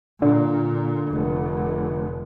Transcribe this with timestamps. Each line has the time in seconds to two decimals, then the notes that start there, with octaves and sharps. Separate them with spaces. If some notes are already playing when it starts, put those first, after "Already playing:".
0.22 A#2 D3
1.10 F1